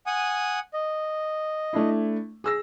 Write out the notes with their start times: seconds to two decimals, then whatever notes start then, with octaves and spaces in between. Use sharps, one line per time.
0.07 F#5 G#5 D#6
0.74 D#5
1.73 A3 D4 E4
2.44 G#4 E6 A#6